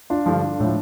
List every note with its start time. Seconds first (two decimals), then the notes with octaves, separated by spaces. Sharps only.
0.10 D4 F4
0.26 G2 D3 F3
0.60 A2 F3